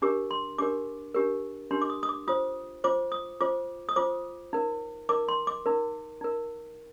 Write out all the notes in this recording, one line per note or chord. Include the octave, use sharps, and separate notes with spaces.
D4 G4 A#4 D6
C6
D4 G4 A#4 D6
D4 G4 A#4
D4 G4 A#4 C6
D6
D#6
D#6
D6
F4 C5 D#6
F4 C5 D6
D#6
F4 C5 D6
D#6
F4 C5 D6
D#4 A#4
D#4 A#4 D6
C6
D6
D#4 A#4
D#4 A#4